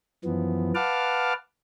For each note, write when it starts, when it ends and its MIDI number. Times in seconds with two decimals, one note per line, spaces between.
0.24 0.72 42
0.24 0.72 52
0.24 0.72 53
0.24 0.72 59
0.75 1.33 71
0.75 1.33 77
0.75 1.33 78
0.75 1.33 81
0.75 1.33 86
0.75 1.33 89